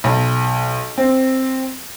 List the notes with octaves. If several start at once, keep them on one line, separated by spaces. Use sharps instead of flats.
B1
C4